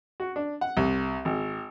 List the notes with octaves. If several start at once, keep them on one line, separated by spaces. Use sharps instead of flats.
F#4
D4
F#5
C2
G#1